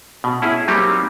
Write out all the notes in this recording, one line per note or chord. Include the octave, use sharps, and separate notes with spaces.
B2
C#4 E4 G#4
F#3 G3 A#3 C4 D#4 G4